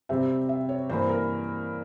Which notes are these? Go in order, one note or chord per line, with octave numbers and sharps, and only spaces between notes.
C3 G3 C4 E5
E5
C#5
G2 E3 A#3 C5
A#4